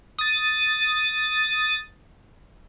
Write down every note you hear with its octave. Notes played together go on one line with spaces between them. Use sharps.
D#6 A6